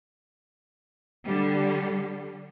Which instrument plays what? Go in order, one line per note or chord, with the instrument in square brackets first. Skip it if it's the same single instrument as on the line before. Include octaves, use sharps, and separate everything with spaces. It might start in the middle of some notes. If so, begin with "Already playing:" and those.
[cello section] D3 G3